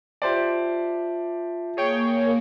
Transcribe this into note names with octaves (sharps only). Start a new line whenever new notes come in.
F4 G4 C5 D5 E5 A5
A#3 G#4 C#5 G5